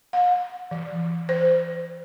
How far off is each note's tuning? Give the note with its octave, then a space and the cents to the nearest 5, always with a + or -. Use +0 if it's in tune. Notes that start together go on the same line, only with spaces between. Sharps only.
F5 +45
E3 +35
C5 -25